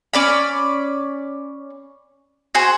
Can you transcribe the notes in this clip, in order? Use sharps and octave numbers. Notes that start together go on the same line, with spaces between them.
C#4 D5 B5
F#4 G#4 C5